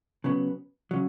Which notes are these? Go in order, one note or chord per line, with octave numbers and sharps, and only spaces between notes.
C#3 F#3 B3
C#3 F#3